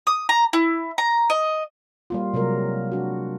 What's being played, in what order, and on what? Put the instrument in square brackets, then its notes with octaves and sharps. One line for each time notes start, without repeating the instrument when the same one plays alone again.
[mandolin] D#6
A#5
E4
A#5
D#5
[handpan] G3 A#3 F4
C3 F#3 G#3 A#4
D4 F#4